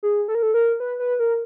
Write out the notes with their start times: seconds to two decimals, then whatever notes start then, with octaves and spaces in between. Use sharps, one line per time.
0.03 G#4
0.28 A4
0.35 A#4
0.43 A4
0.54 A#4
0.80 B4
0.99 B4
1.19 A#4